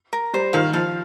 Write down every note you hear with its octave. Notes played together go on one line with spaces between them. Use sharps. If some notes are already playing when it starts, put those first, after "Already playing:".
A#4
G3 C5
D#3 F5
F3 F5